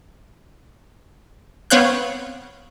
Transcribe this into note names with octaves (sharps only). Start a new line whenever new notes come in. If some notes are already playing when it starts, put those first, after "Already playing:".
B3 C4 C#5 F5 F#6 G6